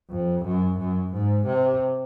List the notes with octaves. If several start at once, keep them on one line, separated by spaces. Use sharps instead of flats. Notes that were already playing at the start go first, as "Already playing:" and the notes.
F2
F#2
F#2
G#2
C3